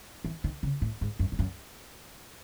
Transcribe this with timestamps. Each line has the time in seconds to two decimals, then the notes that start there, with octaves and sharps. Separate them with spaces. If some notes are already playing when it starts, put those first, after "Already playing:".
0.24 E3
0.44 D#3
0.63 C#3
0.82 A2
1.01 G#2
1.19 F#2
1.32 G#2
1.39 F#2